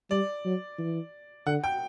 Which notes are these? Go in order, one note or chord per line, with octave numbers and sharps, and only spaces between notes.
G3 D5
F#3
E3
D3 F#5
G5